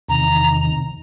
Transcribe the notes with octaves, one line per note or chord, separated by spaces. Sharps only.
E2 C3 D#3 A#5